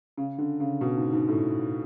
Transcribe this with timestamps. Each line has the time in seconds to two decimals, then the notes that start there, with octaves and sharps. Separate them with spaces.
0.17 C#3
0.38 D3
0.60 C#3
0.81 B2
0.97 G#2
1.13 G#2
1.28 A2